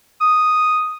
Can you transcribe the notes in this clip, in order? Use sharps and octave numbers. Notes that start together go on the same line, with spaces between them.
D#6